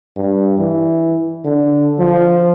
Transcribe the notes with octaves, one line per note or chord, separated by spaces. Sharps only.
G2
E3
D3
F3